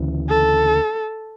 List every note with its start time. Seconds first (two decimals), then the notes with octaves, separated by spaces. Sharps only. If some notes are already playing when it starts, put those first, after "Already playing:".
Already playing: D2 C#3 E3
0.29 A4